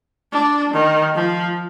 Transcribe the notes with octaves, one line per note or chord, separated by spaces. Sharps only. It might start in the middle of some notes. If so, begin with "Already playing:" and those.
D4
D#3
F3